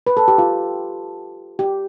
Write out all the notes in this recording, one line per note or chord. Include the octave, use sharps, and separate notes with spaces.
B4
A4
G4
F4
G4